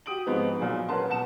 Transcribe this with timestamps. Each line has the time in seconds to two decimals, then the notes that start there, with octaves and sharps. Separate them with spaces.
0.06 F#4 G4 D#6 D7 F#7
0.26 G#2 F3 G#3 B3 C4 D#4
0.59 A#2 F#3 G#4
0.88 C#4 A#4 B4 F#5 A5 C6
1.10 B2 F#5 A5 E7